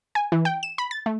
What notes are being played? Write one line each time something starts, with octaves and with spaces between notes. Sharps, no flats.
G#5
E3
G5
E7
B5
A6
A3